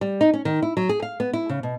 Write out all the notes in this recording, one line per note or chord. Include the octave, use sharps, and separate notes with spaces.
G3
D#4
C#4
D#3
E4
F#3
G#4
F5
B3
E4
C#3
B2